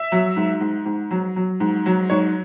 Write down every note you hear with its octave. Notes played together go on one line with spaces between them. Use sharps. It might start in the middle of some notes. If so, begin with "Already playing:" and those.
Already playing: E5
F#3
G#2
G#2
G#2
F#3
F#3
G#2
F#3
G#2 C#5